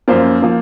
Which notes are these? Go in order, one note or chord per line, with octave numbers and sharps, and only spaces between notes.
F#2 F3 A#3 C5
F3 A#3